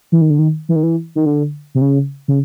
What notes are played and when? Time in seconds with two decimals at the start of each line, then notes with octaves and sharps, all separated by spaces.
0.12 E3
0.21 D#3
0.30 D3
0.39 D#3
0.69 E3
0.76 D#3
0.83 E3
1.15 D#3
1.26 D3
1.75 C3
1.81 C#3
2.28 C#3